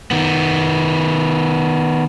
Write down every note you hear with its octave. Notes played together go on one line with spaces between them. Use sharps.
D#3 B3